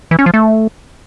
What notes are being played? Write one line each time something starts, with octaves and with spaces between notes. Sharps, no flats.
E3
C#4
F3
A3